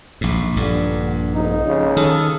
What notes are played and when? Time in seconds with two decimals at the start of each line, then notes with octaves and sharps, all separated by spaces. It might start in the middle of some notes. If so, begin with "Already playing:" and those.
0.21 A#1 G#2
0.56 A#1 G2 D3
1.34 F1 D#4
1.66 C#3
1.97 D#3 A4 D#6 F6